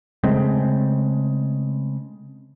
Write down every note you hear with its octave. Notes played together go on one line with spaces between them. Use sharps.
C#3 G#3 A3 C4